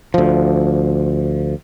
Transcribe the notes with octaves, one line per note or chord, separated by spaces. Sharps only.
D2 F3